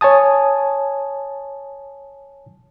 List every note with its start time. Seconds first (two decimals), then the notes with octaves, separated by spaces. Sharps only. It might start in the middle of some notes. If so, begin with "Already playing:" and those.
0.01 C#5 G#5 A5 D#6